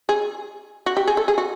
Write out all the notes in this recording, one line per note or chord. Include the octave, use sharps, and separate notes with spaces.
G#4
F#4
G4
G#4
A4
G#4
F#4